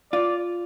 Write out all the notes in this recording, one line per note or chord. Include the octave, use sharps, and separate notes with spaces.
F4 D5